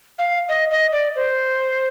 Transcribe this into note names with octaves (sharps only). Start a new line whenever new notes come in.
F5
D#5
D#5
D5
C5